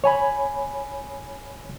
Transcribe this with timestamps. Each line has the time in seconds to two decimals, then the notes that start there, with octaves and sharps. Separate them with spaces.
0.04 C#5 G#5 B5